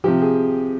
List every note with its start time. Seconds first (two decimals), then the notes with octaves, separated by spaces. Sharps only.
0.04 C3 F3 G4
0.21 G#4